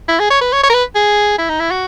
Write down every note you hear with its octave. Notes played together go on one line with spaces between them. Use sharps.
E4
G#4
C#5
B4
C#5
C#5
A#4
B4
G#4
E4
D#4
E4
F#4